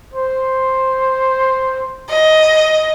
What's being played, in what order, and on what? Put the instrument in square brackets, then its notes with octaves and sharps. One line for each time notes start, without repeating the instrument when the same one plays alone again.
[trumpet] C5
[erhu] D#5